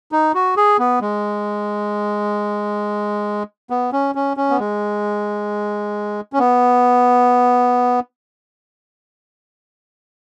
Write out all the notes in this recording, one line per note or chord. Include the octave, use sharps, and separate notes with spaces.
D#4
F#4
G#4
B3
G#3
B3
C#4
C#4
C#4
B3
G#3
C#4
B3